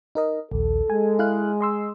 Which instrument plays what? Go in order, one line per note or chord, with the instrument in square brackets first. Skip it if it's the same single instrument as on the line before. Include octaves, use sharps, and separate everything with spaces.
[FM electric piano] D#4 A#4 D#5
[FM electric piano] A#1 D#2 [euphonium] A4
[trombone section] G#3 [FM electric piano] G#5
[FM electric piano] E4 F5 F#6
D#5 C6 E6